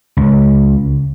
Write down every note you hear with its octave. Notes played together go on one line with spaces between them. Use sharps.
C#2